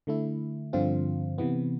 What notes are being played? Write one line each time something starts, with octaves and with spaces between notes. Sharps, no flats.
D3 A3 E4
G2 D3 F3 C4 F4
C3 E3 B3